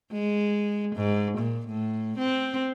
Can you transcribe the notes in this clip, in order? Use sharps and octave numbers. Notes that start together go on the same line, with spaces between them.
G#3
G#2
A#2
A2
C4